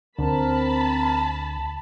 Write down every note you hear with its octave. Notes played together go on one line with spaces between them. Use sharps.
D2 D3 C4 A#4 A5 B5